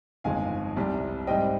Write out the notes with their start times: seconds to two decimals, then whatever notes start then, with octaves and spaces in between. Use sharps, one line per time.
0.24 G1 F2 D#3 G#3 F5 G#5
0.76 C2 C3 G3
1.27 G#2 G3 C4 D#5 G5